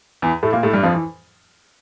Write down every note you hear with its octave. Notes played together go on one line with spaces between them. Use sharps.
E2 E3
A2 A3
A#2 A#3
A2 A3
G2 G3
F2 F3
E3